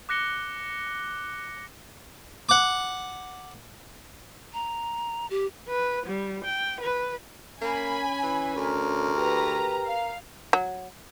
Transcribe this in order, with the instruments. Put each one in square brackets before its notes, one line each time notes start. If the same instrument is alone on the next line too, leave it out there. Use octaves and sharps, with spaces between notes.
[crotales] D6 F#6 A#6 C#7 G7
[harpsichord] F#5 D6
[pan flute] A#5
G4
[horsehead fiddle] B4
G3
G5
B4
[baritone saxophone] A#3 [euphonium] C#4 [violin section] G#5 B5
[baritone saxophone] E3
[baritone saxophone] D2 [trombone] A#4
[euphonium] G4 [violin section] B4 A#5
[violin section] F5
[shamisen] F#3